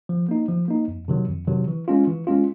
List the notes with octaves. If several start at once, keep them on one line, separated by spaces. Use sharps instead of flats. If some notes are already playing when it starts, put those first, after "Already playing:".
F3
A#3 D#4
F3
A#3 D#4
F2
C3 D#3 F#3
F2
C3 D#3 F#3
E3
G#3 C#4 F4
E3
G#3 C#4 F4